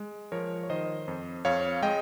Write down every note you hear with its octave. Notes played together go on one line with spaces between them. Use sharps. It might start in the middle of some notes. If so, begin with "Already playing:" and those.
Already playing: G#3
F3 A#4 C#5
C#5
D#3 C5 D#5
F2
F2 C#5 F5
G#3 D#5 G5